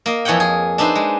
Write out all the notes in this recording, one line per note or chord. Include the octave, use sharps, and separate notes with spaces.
A#3 D#5
F2 E3 C#5 D#5 F#5 G5
G#4
D4 D#4 B4 C5 E5
G#3